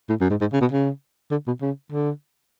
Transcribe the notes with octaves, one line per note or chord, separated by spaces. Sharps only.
A2
F#2
G#2
G#2
C#3
B2
C#3
D3
B2
C#3
D3